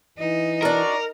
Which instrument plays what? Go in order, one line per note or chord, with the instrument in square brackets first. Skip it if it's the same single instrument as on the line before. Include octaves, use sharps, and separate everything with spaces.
[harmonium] E3 [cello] D#4
[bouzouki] D4 F#4 [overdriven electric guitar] A#4